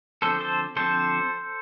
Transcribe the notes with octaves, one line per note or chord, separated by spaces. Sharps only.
D3 F3 C4 A4 C5
A4 C5
D3 F3 C4 A4 C5